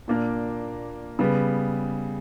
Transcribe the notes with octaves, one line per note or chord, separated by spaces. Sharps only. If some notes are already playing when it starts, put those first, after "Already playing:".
A#2 A#3 D4 A#4
C#3 G3 B3